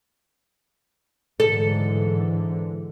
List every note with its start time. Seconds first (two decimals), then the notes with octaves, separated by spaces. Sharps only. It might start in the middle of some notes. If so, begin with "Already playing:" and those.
1.40 G#2 D3 E3 A4